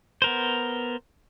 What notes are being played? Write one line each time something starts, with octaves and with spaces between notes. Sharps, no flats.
B3 A#4 C5